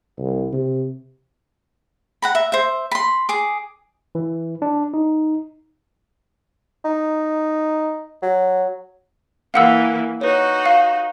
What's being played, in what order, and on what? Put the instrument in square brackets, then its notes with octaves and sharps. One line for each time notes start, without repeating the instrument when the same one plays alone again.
[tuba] C2
C3
[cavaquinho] F#5 A#5 B5
E5
C5 E5
B5 C6
G#4 D6
[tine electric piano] E3
D4
D#4
[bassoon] D#4
F#3
[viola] E3 A#3 [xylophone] F5 F#5 E6
[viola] D#4 F#4 [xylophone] B4 C#5
[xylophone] F5